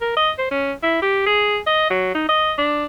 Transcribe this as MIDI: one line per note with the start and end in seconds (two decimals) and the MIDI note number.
0.01 0.13 70
0.17 0.31 75
0.39 0.46 72
0.51 0.73 61
0.83 1.01 64
1.02 1.23 67
1.26 1.57 68
1.67 1.87 75
1.90 2.14 54
2.14 2.24 63
2.29 2.53 75
2.58 2.85 62